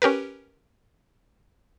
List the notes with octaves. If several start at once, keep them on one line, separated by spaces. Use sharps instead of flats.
C#4 G4 A#4 B4